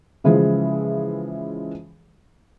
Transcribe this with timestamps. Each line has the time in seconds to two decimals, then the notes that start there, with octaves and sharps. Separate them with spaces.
0.24 C#3 E3 F3 G#3 G#4